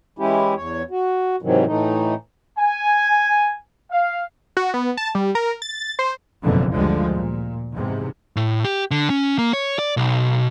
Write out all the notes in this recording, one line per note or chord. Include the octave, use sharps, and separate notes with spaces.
E3 G#3 C#4 E4 G4
E2 C#5
F#4
G#2 C3 D#3 E3 F#3
A2 E3 A3 D#4
G#5
F5
F#4
B3
A5
G3
A#4
A6
C5
F#1 F2 G#2 B2 D3 E3
D2 D3 F3 G3 G#3
A#2
E2 G#2 C3
A2
G4
D3
C#4
A#3
C#5
D5
B1